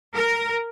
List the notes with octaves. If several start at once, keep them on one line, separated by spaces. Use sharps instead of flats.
A#4